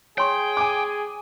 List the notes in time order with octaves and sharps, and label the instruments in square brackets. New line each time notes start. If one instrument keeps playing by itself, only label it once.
[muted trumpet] G#4 [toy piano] C#5 C6 C#6 [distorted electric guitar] G5
[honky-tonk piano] G#5 D6